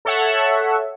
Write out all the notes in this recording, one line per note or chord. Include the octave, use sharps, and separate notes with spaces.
A4 C#5 E5 F#5